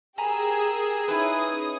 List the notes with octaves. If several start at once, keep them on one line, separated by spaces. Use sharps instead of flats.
G4 G#4 A#4 G#5 A#5 B5 E6
C#4 D#4 E4 B4 D#6